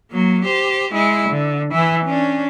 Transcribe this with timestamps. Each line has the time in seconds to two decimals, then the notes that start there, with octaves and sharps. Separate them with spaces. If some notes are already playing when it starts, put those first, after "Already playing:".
0.11 F#3 A#3
0.45 G4 C5
0.93 G#3 E4
1.29 D3
1.72 E3 E4
2.05 C#4 D4